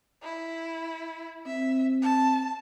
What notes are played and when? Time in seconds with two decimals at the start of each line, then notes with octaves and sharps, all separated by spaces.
0.23 E4
1.46 C4 E5
2.02 A5